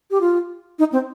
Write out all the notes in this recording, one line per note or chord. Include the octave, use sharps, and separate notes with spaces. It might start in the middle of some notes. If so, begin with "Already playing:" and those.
G4
F4
D#4
C4